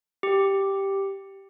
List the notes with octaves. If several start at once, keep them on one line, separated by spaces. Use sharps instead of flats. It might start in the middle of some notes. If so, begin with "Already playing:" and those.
G4